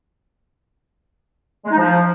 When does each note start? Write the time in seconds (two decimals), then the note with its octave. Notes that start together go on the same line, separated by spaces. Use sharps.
1.65 G#3
1.71 D#4
1.78 F3